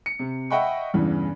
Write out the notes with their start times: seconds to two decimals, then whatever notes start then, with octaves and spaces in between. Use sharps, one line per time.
0.06 C#7
0.19 C3
0.50 D#5 E5 F#5 G5 B5 C#6
0.94 E2 G2 C#3 E3